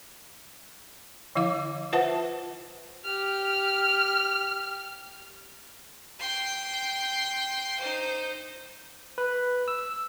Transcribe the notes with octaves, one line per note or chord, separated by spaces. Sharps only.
D3 F3 E4 F5 D6
F4 B4 C5 E5 F#5 A5
G4 F6
G5 C6
D#4 C5
B4
E6